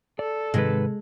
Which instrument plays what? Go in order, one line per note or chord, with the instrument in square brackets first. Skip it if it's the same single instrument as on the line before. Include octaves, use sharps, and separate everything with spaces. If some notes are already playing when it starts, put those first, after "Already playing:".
[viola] A4 [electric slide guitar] D5
[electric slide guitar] G#2 D#3 B4 [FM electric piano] C3 [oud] G#3